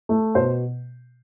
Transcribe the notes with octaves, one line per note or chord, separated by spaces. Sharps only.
A3
B2 C5